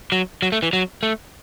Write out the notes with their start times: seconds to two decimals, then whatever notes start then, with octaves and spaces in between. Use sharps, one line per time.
0.12 F#3
0.42 F#3
0.52 A3
0.63 E3
0.73 F#3
1.03 A3